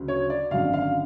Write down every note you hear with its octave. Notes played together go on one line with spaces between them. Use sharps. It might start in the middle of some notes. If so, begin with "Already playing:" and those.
Already playing: D2 C#3 F#3 C#4
C#5
D5
G#1 F#2 D3 F5
F5